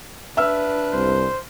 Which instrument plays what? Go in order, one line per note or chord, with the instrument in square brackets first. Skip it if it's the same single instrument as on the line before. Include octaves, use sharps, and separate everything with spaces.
[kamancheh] D4 B4 [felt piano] E5 E6 F6
[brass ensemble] C2 [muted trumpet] C5